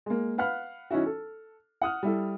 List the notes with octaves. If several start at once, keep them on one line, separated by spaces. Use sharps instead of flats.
G#3 A#3
B4 F5 F#5 B5 F6
E3 C#4 D#4 E4 F#4
A4
F#5 D#6 F6
G3 E4 A4